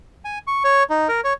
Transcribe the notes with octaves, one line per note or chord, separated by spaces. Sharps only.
G#5
C#6
C#5
D#4
A#4
C#5